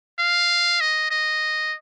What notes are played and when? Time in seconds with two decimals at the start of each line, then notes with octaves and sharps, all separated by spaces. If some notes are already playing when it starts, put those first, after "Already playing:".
0.19 F5
0.81 D#5
1.10 D#5